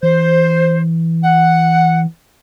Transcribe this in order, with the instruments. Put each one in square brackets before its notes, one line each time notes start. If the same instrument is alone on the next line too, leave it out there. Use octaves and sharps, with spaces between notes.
[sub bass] E3 [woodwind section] C5
[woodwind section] F#5